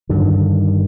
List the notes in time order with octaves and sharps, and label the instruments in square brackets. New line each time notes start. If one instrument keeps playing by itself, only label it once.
[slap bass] G2 D3 D#3